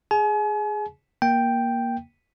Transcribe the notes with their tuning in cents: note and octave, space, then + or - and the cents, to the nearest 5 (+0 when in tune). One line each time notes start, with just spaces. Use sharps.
G#4 +0 G#5 +40
A#3 +15 G5 +0